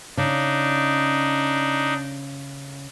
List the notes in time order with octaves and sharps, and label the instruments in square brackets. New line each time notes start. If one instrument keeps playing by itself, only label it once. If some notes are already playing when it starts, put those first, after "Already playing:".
[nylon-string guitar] C#3 [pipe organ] D4 D#4